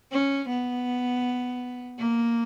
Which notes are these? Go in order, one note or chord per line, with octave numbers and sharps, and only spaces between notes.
C#4
B3
A#3